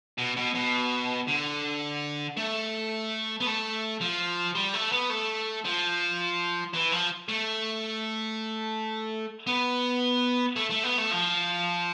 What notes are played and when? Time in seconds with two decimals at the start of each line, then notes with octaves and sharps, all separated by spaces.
0.18 B2
0.37 B2
0.55 B2
1.28 D3
2.37 A3
3.40 B3
3.47 A3
4.01 F3
4.55 G3
4.74 A3
4.92 B3
5.10 A3
5.65 F3
6.74 E3
6.92 F3
7.29 A3
9.47 B3
10.56 A3
10.70 A3
10.83 B3
10.98 A3
11.11 F3